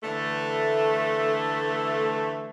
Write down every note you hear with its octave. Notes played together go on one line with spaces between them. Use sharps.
D3 E3 A3